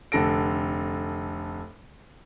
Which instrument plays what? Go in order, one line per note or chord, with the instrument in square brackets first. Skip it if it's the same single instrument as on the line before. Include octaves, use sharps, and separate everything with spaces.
[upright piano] F1 D3 A4 A#6 D7